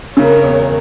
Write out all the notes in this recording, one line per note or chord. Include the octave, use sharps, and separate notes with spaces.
C#3 A#4 C#5
E1